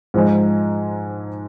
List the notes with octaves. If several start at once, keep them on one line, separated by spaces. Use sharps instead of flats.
G#2 F3 G#3 D#4